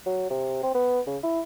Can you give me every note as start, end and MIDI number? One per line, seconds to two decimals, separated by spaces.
0.06 0.30 54
0.30 0.63 48
0.63 0.71 60
0.75 1.01 59
1.07 1.18 49
1.24 1.41 64